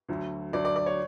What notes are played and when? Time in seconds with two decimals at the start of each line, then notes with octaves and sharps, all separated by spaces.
0.09 D2 D3 F#3
0.53 D2 D3 F#3 D5
0.65 D5
0.76 D5
0.86 C#5